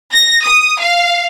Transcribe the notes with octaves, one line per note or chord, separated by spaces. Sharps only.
A#6
D#6
F5